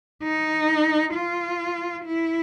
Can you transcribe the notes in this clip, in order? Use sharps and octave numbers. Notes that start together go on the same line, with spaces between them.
D#4
F4
E4